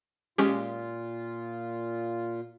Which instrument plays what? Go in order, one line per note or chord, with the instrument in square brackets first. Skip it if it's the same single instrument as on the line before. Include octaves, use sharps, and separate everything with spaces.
[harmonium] A#2 F4 [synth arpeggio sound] G#3 C#4 G4